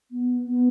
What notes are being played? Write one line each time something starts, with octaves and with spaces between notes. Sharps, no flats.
B3
B3